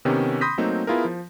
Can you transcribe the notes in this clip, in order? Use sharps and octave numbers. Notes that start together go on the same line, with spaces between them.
C3 D#3 B3 C#4 G4
B5 C6 D#6 G6 A#6 B6
F#3 A3 A#3 C4 D#4
B3 E4 F4 G#4 A#4
F3